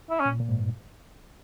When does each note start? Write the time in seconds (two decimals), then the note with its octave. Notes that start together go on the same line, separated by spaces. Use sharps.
0.10 E4
0.20 C#4
0.25 A#2
0.40 A#2
0.49 G#2
0.59 G2